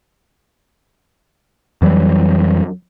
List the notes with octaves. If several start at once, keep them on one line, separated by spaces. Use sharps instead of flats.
F2 E3 F#3 G3